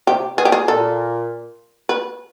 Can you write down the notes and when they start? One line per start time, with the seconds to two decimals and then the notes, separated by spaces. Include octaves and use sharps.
0.07 C3 G4
0.37 B2 G#4
0.45 G4
0.52 G#4
0.68 A#2 A4
1.89 B4